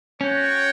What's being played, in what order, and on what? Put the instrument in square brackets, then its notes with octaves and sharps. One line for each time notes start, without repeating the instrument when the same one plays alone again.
[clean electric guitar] C#4 [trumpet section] F#4 C#5 G5